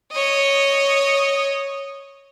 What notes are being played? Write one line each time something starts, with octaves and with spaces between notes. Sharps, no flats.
C#5 D#5